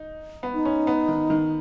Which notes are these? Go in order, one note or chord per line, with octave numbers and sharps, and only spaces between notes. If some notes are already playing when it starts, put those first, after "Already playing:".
Already playing: D#4
B3
D#4
C#4
B3
D#3
D#3